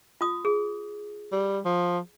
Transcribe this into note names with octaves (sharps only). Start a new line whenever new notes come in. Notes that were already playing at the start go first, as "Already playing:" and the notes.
F4 D#6
G#4
G3
F3